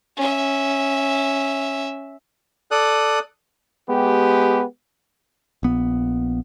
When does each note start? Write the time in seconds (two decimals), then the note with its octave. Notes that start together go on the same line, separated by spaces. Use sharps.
0.16 C#4 E5
2.71 A4 D5 D#6 F#6
3.90 G#3 B3 G4
5.63 A#1 B3